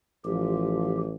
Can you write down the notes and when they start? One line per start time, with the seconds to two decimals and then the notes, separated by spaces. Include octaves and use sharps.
0.25 A1 F3 G4